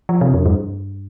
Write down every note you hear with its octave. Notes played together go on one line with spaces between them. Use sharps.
F3
C3
F2
G2